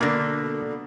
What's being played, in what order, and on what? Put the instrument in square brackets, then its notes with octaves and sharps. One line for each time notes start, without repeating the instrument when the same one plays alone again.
[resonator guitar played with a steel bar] B2 D3 [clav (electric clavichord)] A#3 D4